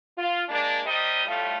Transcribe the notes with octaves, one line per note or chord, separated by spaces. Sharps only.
F4
G#3 A#3 D4
C3 G3 D#5
A2 G3 A3 F4